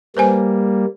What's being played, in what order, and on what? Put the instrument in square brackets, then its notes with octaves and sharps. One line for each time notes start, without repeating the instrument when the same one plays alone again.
[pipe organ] G3 A#3 [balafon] B4 C5 G#5